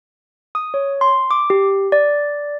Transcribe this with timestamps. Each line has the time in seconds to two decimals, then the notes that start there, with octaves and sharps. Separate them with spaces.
0.55 D#6
0.74 C#5
1.01 C6
1.31 D6
1.50 G4
1.92 D5